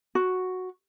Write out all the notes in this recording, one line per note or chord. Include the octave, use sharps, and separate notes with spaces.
F#4